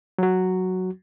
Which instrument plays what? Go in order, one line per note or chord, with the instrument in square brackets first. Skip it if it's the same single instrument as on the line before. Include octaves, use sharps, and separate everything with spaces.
[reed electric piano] F#3 F#4